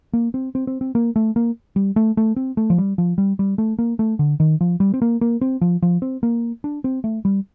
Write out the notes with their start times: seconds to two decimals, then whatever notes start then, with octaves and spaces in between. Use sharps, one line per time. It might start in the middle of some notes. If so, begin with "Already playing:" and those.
0.13 A#3
0.34 C4
0.55 C4
0.67 C4
0.81 C4
0.95 A#3
1.16 A3
1.36 A#3
1.76 G3
1.96 A3
2.17 A3
2.36 C4
2.57 A3
2.70 F3
2.78 G3
2.98 F3
3.18 G3
3.39 G3
3.58 A3
3.79 A#3
3.99 A3
4.19 D3
4.40 D#3
4.61 F3
4.80 G3
4.94 C4
5.02 A#3
5.21 A#3
5.41 C4
5.61 F3
5.82 F3
6.02 C4
6.23 A#3
6.64 D4
6.84 C4
7.04 A3
7.25 G3